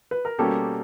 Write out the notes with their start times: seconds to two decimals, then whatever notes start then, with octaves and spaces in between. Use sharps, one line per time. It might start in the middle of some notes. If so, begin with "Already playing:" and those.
0.11 B4
0.25 A#4
0.38 B2 G3 A#3 C#4 G4 A4